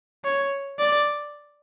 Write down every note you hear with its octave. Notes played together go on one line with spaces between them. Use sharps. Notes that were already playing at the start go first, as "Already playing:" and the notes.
C#5
D5